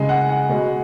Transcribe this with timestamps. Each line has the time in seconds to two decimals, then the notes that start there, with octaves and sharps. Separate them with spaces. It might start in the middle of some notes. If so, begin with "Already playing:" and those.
Already playing: C#3 G#3 G#5
0.09 F#5
0.29 F#5
0.49 B2 G#3